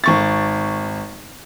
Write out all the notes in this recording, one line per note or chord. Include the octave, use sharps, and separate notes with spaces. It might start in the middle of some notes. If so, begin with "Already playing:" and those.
G#1 C#6 A6